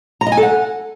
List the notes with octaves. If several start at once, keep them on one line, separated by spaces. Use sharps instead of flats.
A#5
D#5
G#5
A4
F#5